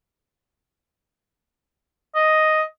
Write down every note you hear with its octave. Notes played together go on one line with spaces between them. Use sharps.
D#5